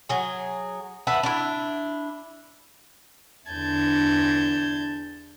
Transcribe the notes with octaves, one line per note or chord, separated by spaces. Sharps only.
F#3 G#4
B4 E5 F#5 A5
D4 E4
E2 D3 D4 A5 G6 G#6